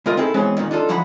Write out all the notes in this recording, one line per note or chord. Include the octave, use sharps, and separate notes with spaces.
D2 A2 F4 A#4 D#5
C4 D#4 E4 G#4 A4
B2 E3 G#3 C4 C#4
D#2 A#2 D#3
D4 D#4 F4 A4
D2 E3 F3 F#5 A#5 B5